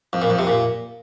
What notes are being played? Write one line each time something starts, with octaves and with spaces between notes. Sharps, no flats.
F2
A#2
F2
C3
A#2